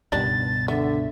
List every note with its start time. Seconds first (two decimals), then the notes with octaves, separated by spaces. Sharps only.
0.12 C#2 G2 B2 D#3 G3 D4 A6
0.68 D3 B3 E5